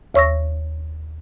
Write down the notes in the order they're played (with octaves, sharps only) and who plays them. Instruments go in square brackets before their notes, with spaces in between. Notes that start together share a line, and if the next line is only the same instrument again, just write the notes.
[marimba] D#2 C#5 C#6 E6 A#6